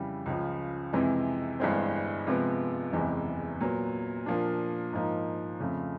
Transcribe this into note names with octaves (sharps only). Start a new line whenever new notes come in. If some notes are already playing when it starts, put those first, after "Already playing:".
Already playing: F2 C#3 E3 G3
C#2 C#3 F3
F2 C3 E3 G#3
G1 G2 E3 G#3 C4
C3 F3 G#3 B3
F#1 E2 C3 E3 G#3
A#2 F#3 B3
A#2 F3 A#3 D4
G#2 F3 A#3 D#4
F2 C#3 F3 A3